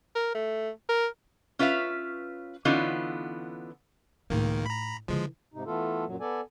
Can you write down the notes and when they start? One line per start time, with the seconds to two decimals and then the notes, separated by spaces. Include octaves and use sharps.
0.16 A#4
0.35 A3
0.89 A#4
1.59 C#4 F4 B4 E5 F5
2.65 D3 E3 B3 C#4 D#4 F4
4.30 C#2 A2 D#3 A#3 D#4
4.66 A#5 B5
5.08 D3 E3 F3 G#3
5.54 G#2 C3 D#4
5.66 E3 A3 B3 F4 A4
6.06 F#2 A#2 F#3
6.20 B3 A4 D5 G#5